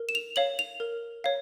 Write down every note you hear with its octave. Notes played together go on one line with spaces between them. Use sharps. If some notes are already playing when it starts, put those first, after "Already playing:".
Already playing: A#4
E7
F7
C#5 F5 F#7
F7
A#4
C#5 F5